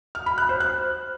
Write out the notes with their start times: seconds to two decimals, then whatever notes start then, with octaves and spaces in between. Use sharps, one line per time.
0.15 F6
0.26 B5
0.38 F#6
0.49 C5
0.60 F#6